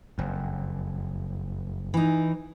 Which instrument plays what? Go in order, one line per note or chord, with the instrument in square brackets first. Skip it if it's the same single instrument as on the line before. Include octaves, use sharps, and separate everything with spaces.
[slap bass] F#1 F2
[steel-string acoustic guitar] E3 D#4